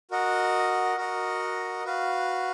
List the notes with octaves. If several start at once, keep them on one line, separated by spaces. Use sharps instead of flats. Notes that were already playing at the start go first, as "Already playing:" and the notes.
F#4 A#4 D#5 F#5
F#4 A#4 D#5 F#5
F#4 B4 F5